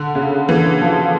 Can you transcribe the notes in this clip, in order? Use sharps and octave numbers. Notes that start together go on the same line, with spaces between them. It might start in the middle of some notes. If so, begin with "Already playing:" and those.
Already playing: D3
C#3
E3
F3